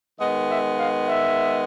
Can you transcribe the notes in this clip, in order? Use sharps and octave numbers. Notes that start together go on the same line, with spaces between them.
D#3 G#3 B3 D#5
E5
F5
E5